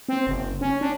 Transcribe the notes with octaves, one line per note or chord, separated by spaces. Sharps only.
C4
F#1
C#4
D4